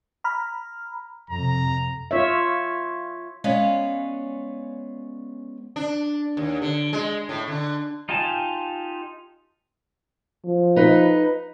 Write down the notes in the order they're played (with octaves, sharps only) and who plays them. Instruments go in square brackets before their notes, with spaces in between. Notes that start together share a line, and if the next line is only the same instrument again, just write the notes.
[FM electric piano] A#5 B5 F6
[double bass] F2 C3 [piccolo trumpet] A#5
[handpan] F4 C#5 E5
[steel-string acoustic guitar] G#3 B3 C#4 C#5 D5 F5
[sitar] D4
D#2
D3
G#3
A2
D3
[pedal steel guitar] D#4 F4 G4 G#5 A5
[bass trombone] F3
[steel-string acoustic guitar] D#4 B4